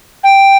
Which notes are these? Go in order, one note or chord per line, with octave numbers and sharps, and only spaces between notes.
G5